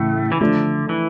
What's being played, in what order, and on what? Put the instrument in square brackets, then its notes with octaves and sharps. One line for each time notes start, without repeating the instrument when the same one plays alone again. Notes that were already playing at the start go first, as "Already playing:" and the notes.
Already playing: [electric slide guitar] A2 A3 [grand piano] C#3 E3
[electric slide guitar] E3
[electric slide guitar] D3 [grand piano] F3 A3 D4
[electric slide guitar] E3